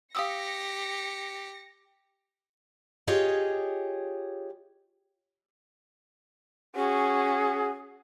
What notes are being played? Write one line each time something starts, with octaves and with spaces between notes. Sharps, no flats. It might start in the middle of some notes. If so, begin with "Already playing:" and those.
G4 F5 D#6 E6 A#6 C#7
F4 G4 G#4 C#5 D#5
C#4 F#4 G#4